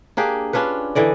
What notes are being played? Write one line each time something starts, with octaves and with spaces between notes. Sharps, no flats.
A#3 D4 G4 G#4
C#4 D4 F4 B4
D3 E3 D5 D#5